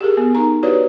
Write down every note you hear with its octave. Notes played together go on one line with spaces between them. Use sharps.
G4 G#4 A#4
B3
D#4 A#4 A#5
E4 F#4 G4 B4 C#5 D5